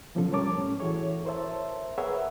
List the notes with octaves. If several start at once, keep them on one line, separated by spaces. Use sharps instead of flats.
B2 D3 F3 C#4 F4 A4
G3 C#4 A#4 C#5 A5 D6
A2 C#4
E3 E4 F#4 G#4 A4 C#5
A#4 C5 C#5 E5 A5
G#4 A#4 B4 C#5 E5 F#5